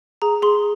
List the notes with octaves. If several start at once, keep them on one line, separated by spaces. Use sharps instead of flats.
G#4 A#5
G#4 C6